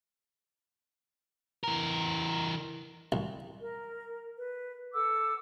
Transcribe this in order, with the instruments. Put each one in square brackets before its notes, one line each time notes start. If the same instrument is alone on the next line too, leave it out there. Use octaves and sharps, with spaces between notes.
[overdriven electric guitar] E3 A#4
[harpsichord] C2
[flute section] A#4
B4
A4 F#5 D6 E6